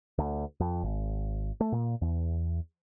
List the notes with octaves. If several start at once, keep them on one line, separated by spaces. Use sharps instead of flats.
D2
F2
G#1
A3
A#2
E2